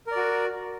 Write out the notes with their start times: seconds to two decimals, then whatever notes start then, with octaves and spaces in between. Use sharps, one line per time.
0.07 A#4
0.12 D5
0.16 F#4